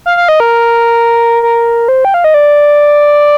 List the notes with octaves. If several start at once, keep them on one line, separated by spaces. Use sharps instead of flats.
F5
F5
D#5
A#4
A#4
C5
G5
F5
D#5
D5